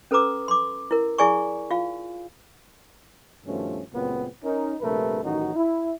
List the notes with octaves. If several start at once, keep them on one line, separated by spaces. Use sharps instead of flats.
C#4 A4 B4 A#5 D6 E6
C6 D6
E4 A#4
E4 G#4 D5 G#5 C#6
F4 F5
G2 B2 D#3 F3 A3 C#4
C#2 F#2 A#2 B3 C4
C#4 D#4 A#4
A#1 G2 C3 A3 A#4 B4
A1 F#2 D#3 D#4 F#4
E4